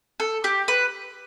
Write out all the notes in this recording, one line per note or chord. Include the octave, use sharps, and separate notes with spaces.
A4
G4
B4